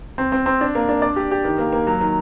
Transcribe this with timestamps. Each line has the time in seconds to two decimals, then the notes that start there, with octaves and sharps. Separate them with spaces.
0.18 C4
0.32 C4
0.46 C4
0.61 D4
0.75 A#3
0.89 D4
1.02 D5
1.16 G4
1.31 G4
1.44 D#3
1.59 A#3
1.72 A#3
1.87 F#3
2.01 D#3